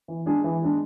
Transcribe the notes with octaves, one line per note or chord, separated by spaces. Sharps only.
E3
G#3 D4 G#4
E3
G#3 D4 G#4